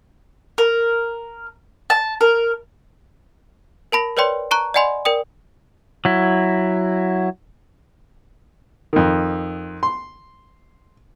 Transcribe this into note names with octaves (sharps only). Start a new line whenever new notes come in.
A#4
A5
A#4
A#4 A5 B5 A#6
A#4 B4 C#5 D5 G5 C6
A5 A#5 C#6 F#6
D5 D#5 F#5 G#5 B5 C6
A#4 D5 G5 D#6
F#3 E4
F2 D#3
C6